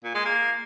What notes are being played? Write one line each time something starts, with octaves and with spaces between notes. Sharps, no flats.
A#2
G#3
A#3